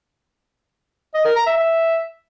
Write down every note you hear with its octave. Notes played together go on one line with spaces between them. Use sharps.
D#5
A#4
A#5
E5
E5